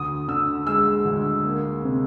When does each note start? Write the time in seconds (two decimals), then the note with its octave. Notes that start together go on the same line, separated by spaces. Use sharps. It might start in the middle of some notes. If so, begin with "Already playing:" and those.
Already playing: D2 D#6
0.28 D3 E6
0.67 G#3 E6
1.05 D2
1.45 A#3
1.83 C3